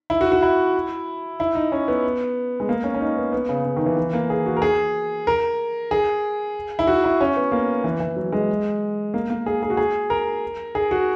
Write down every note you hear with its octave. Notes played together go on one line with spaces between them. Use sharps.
E4
F#4
F#4
E4
E4
D#4
C#4
B3
G#3
A#3
C#4
C#4
D#4
B3
B3
C#3
C#3
D#3
E3
E3
A#3
G#4
F#4
A#4
G#4
A#4
G#4
E4
F#4
E4
C#4
B3
A#3
E3
E3
F#3
G#3
A#3
A#3
G#4
G#4
F#4
G#4
A#4
G#4
F#4